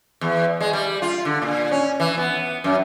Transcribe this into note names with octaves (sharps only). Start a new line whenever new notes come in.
E2
G#3
G3
F4
D3
A#2
C#4
E3
B3
F#2